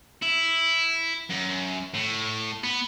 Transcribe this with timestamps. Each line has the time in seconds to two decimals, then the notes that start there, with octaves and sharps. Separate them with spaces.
0.22 E4
1.30 F#2
1.94 A2
2.64 B3